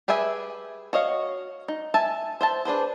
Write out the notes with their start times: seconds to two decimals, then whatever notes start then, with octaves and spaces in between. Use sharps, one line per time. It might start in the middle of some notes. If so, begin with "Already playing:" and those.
0.08 G4 G#4 B4 E5 G#5
0.93 F#4 C#5 D#5 F5
1.68 D#4
1.94 E5 G#5 A5
2.41 C5 E5 A5
2.65 D4 G#4 B4 C5